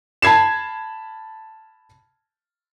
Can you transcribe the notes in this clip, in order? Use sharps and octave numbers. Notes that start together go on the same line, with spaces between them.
A5 B5 G#6 C7 E7